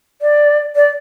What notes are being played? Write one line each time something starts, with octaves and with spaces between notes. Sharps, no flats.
D5
D5